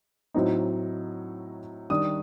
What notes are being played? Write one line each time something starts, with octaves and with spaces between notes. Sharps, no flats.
A2 F#3 C4 D#4
D#3 G3 D4 D#6